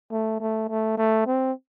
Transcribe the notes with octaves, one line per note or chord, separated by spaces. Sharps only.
A3
A3
A3
A3
C4